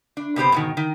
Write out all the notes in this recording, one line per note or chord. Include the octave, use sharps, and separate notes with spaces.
D4
C3 B3 G4 C5
G#2 B2 D#3
D#3